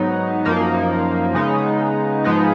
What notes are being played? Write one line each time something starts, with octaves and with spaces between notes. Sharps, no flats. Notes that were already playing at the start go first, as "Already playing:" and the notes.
Already playing: G#2 F#3 B3 D#4
F#2 F3 A#3 D#4
C#3 G#3 B3 D#4
G#2 F3 G#3 B3 D#4